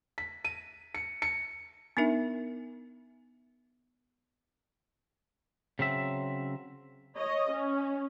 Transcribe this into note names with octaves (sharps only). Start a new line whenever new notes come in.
B6
D#7
C#7
C#7
B3 D4 D#4 A#4 E5
C#3 F#3 C4 E5
C#5 D#5
C#4